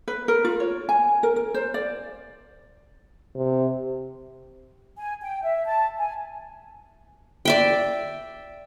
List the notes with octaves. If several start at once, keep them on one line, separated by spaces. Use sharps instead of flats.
B4
A#4
F4
C#5
G#5
A#4
A#4
C5
D5
C3
G#5
G5
E5
A5
G#5
D5 E5 G5